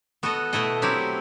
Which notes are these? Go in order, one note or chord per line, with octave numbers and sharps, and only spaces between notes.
B3 F#4 A4 D#5
B2 A3 E4 A4 D#5
F#3 C4 E4 G4